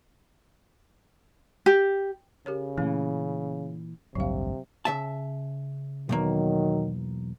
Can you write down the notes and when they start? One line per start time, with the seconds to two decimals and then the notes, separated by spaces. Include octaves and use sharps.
1.66 G4
2.46 C#3 G4 A#4 C#5
2.78 A#2 E3 A3 C#4
4.15 A1 D2 G2 C3 F#3 F5
4.85 C#3 E5 A5
6.09 B1 E2 D#3 F#3 A#3